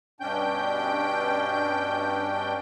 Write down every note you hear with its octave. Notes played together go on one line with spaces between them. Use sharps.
G2 B2 C#4 D4 G5 G6